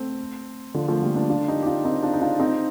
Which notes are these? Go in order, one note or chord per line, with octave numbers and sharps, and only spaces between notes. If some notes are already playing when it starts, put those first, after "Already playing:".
Already playing: A3 C4
D3 F3
F3 A3
G3 A#3
A#3 D4
D4 F4
D#4 G4
G4
D4 F4
C4 D#4
D4 F4
D#4
D4 F4
C4 D#4